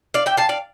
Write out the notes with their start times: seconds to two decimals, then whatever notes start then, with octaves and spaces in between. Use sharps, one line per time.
0.14 D5 F5
0.26 E5 G5
0.37 F5 A5
0.49 D5 F5